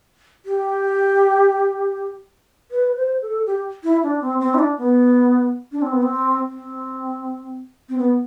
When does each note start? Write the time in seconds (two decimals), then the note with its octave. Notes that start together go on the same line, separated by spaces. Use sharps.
0.45 G4
2.71 B4
2.96 C5
3.22 A4
3.46 G4
3.84 E4
4.03 D4
4.21 C4
4.40 C4
4.55 E4
4.59 D4
4.78 B3
5.72 D4
5.82 C4
5.93 B3
6.02 C4
6.47 C4
7.89 C4
7.98 B3